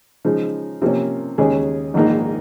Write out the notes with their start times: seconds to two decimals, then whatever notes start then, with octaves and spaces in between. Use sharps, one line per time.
0.25 C#3 F3 G#3 D#4
0.82 C3 F3 A#3 C#4
1.38 D#2 C#3 G#3 C#4 G#4
1.94 A#1 G#2 D#3 A#3 D#4